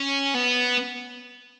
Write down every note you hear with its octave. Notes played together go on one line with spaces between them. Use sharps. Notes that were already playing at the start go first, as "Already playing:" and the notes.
Already playing: C#4
B3